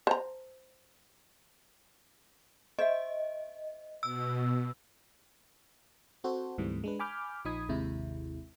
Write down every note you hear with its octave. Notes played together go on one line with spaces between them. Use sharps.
C5 A#5
C5 D#5 E5
B2 E6
C4 F#4 A4 C5
D2 G#2 E3 G3 A3 C4
G#3 D4 B4
G#5 B5 D6 F6 G6
A#1 F3 D#4 B5 D#6 G#6
G#1 D#2 C3 G#3 E4